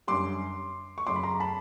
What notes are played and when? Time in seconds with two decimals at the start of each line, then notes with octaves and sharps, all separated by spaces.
0.07 F#2 D3 G3 C6 D6
0.98 C#6
1.07 F#2 C#3 F#3 C6 D6
1.16 B5
1.23 A#5 C6
1.40 A5 B5